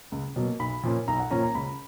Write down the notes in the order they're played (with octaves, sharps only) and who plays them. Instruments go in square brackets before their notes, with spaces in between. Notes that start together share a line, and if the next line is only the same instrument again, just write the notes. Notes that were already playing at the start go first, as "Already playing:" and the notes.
[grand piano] C#2
B2 F#3 A#3
B1 B5
A#2 F3 A#3 C#4
B1 A#5
F#5
A#2 F3 A#3 C#4 A#5
A#5
C#2 B5